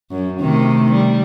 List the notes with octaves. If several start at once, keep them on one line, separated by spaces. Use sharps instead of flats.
F#2
C3 D#3 A3
G3